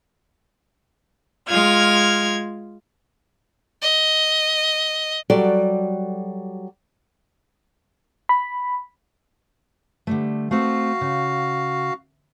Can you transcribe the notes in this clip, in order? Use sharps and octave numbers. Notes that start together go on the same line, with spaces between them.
G#3 F4 F6 G#6
D#5
F#3 G3 F#4 G4 A4 D5
B5
D3 G3 A3
A3 C4 F#4 F5
C#3